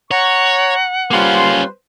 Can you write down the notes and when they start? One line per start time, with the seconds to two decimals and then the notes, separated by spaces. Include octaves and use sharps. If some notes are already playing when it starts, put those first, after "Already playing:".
0.11 C#5 F#5 A#5 C#6
1.11 G3 A#3 C#4 F4 B4 C5 C6